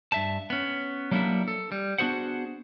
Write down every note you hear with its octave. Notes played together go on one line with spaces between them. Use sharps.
G2 E5 A5
B3 C#4
F#3 G3 A#3 B3 D4 E4
A4
G3
B3 D4 F#4 G#4 C5 F#5